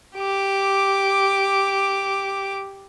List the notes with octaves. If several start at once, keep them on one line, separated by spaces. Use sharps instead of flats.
G4 D6